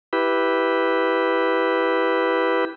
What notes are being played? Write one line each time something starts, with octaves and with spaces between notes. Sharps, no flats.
E4 G4 B4